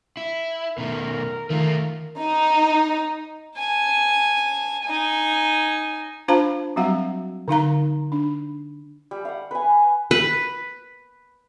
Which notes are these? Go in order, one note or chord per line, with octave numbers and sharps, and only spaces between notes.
E4
B2 D#3 A3 A#4
D#3 A3 F4 A#4
D#4
G#5 A5
D#4 G#5
D4 F4 C5 F5 A5 A#5
F#3 G3 C4 F#4 F5 F#5
D3 D#4 F5 A#5
D4
G3
F5 F#5
B4 G#5
B4